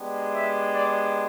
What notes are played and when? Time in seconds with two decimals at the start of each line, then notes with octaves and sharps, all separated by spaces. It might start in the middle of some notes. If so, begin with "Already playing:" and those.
Already playing: G#3 B3 D4 G4
0.33 E5
0.74 D5